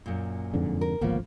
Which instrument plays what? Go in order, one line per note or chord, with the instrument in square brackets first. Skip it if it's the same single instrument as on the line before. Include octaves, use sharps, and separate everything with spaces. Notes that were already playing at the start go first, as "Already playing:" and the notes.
[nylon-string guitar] F#2 A#2
[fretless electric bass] F2 G#2 D3
[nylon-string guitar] A#4
[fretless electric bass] D1 G#1 F3 [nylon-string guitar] C#3 A#3 B3